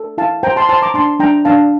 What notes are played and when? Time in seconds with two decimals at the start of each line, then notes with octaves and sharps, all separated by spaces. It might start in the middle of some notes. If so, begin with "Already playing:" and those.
Already playing: A4
0.18 E4 F5 A5
0.43 C5 G5 A#5
0.56 A5 C6
0.69 C5 A5 C6
0.82 A#5 D6
0.94 D4 A5 C6
1.20 D4 G5 A#5
1.45 D4 F5 A5